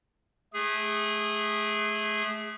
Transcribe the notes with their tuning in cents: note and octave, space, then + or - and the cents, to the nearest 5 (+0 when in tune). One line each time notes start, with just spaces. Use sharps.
A3 -30 G#4 -15